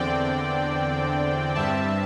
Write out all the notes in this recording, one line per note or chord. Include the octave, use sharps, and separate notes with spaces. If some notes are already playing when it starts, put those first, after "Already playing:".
Already playing: E2 D3 C4 D5 G5
G2 G3 C4 E5 A5